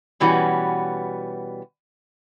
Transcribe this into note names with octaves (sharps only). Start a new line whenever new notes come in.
B2 E3 G3 B3 C#4 F#4